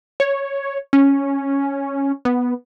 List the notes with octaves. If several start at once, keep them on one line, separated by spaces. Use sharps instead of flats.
C#5
C#4
B3